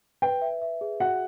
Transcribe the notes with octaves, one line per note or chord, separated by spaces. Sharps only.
B4 G5
E5
E5
G#4
F#4 F#5